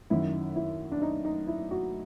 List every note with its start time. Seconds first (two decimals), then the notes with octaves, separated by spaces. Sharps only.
0.10 F#2 D#3 E4
0.56 E4
0.92 D4
1.02 D#4
1.25 D#4
1.47 E4
1.71 F#4